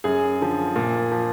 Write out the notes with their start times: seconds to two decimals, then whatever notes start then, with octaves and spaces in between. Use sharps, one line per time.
0.04 F#2 G#4
0.40 D3 F3
0.76 A#2
1.12 F3